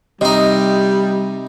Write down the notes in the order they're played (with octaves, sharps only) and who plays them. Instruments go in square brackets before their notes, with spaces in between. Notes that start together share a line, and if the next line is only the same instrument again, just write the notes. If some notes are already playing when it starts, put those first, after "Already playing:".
[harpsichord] C3 D#4 [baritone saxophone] G3 [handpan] D#5